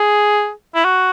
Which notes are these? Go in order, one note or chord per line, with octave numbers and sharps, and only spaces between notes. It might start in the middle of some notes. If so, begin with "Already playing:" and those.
Already playing: G#4
E4
F#4